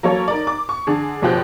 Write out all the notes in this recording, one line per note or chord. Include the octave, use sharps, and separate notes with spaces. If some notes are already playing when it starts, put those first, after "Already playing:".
F#3 A#3 C#4 A4 C#5
D#4 A#4 D5
D6
C#6
D3 D4 G#4
F#1 B2 F3 G4 C5 F#6